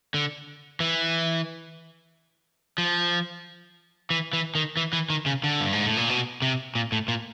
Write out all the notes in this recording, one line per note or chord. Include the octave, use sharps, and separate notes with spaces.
D3
E3
F3
E3
E3
D#3
E3
E3
D#3
C#3
D3
G2
G#2
A2
A#2
B2
C3
A#2
A2
A#2